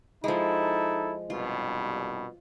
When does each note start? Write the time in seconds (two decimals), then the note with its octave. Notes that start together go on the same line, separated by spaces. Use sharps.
0.24 F3 G#3 D#4 E4 A4
1.30 C2 G2 B2 F4